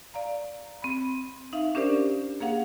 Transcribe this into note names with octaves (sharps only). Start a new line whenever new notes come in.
D5 F5 A#5
C4 B5
D#4 E5 F5
C#4 D4 G4 A#4 C5 D5
A#3 G#4 F5 F#5